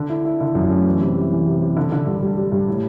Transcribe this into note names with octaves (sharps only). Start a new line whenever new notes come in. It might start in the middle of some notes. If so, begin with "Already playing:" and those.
Already playing: D3
E4
E4
D3
F#2
A3
E3
C3
G3
E3
C3
C3
D3
D3
G2
G3
G3
G2
A2